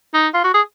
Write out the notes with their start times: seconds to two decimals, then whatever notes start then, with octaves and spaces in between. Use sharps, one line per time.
0.14 D#4
0.34 F4
0.44 F#4
0.54 G#4